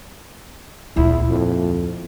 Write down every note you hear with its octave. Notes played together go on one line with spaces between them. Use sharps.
D2 A#2 E4
F2